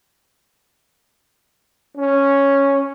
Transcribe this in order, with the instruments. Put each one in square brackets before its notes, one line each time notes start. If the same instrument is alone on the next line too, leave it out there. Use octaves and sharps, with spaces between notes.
[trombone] C#4